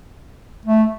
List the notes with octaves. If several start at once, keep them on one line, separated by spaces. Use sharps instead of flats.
A3